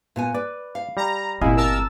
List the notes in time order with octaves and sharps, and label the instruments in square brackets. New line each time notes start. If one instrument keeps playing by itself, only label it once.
[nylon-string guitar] A#2 B3 G#5
[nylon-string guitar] B4 [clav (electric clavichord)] D5
[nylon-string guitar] F5
[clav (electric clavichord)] G3 [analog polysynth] A#5
[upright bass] G1 C4 [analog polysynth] A#2 E4 [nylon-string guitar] G4 [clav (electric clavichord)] D#5 F5 G#5
[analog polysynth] A#4 A5 E6